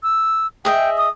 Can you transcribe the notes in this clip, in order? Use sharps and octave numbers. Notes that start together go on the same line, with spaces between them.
E6
G#4 D#5 E5 G5
D#6